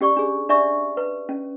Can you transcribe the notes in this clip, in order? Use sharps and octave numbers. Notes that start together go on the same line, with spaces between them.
C#4 G4 D5 C#6
D4 G#4
D4 D5 E5 C#6
B4
C#4